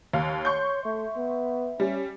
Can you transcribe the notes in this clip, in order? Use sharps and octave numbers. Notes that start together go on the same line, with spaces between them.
D#2 F5
C#5 C6 C#6 G6
A3 E5
B3
G3 C#4